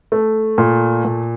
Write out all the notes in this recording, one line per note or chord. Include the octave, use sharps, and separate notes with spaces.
A3
A#2
A#2